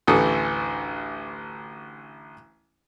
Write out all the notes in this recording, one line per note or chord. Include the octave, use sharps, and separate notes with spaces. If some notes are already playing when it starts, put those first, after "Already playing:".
A1 D2 E3 A4 D#6